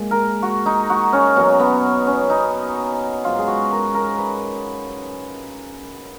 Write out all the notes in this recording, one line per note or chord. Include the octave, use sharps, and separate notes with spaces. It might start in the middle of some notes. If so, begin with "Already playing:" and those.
Already playing: A#2 G#3
A#4
F#4
D#4
F#4
C#4
B2 F#3 C#4
B3
C#4
D#4
G#2 F#3 F4
G#4
F#4
A#4
A#4
B4